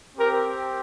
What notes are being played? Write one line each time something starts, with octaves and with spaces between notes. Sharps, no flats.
C4 G4 A#4